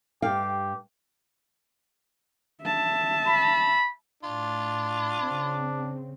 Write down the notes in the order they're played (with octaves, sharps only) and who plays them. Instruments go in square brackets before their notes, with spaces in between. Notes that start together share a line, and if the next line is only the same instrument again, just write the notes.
[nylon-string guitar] G2 F5 G5 [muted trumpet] G4
[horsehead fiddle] E5 A5
[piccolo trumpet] B5
[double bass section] A2 [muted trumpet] D4 [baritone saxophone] F4
[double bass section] C#3 C4